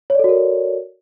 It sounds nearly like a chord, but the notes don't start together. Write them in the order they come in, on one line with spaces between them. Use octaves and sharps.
C#5 D5 A4 F#4 A#4